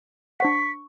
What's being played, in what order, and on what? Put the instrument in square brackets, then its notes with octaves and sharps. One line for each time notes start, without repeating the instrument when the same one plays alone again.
[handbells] D4 C5 F#5 [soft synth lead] C#6 [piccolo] B6